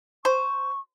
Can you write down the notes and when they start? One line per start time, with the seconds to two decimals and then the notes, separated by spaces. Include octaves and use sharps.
0.25 C5 C#6